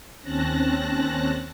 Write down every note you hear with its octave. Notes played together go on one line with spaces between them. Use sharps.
D#2 C4 C#4 A5 F#6 A#6